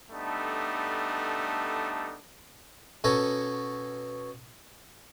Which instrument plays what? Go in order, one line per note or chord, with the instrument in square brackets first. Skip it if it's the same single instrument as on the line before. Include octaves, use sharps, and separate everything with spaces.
[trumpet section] G3 A3 B3 D4 D#4 A4
[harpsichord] B2 C#4 A4 G#5 A#5